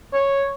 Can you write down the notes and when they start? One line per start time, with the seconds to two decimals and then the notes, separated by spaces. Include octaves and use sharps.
0.13 C#5